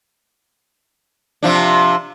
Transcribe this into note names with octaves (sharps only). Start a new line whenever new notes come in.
C3 F3 D4